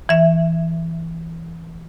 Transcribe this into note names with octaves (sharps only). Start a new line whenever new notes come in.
E3 E5